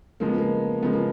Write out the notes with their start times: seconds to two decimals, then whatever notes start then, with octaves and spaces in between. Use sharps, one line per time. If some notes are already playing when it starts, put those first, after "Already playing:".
0.20 C#3 F3 G#3 A#3
0.29 B3
0.38 A#3
0.83 C#3 F3 G#3 B3
0.93 A#3